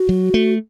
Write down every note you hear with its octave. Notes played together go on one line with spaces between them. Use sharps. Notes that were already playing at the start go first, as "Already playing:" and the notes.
Already playing: F#4
F#3
A3